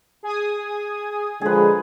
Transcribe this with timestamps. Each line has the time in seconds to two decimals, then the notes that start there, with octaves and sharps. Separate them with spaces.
0.23 G#4 G#5 D#6
1.41 D3 F3 G#3 G#4 B4